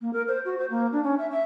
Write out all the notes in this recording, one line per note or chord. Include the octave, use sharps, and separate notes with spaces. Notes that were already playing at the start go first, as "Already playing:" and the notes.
A#3
A#4
C5
F#4
C5
A#3
D4
C#4
E5
E5